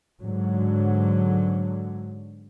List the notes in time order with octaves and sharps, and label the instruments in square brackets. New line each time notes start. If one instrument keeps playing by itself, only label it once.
[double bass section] G#2 D3 F#3